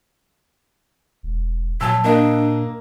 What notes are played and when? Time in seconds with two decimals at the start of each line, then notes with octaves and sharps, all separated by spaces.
1.23 E1
1.81 A#2 F#3 A5 E6
2.04 A#3 D4 D#5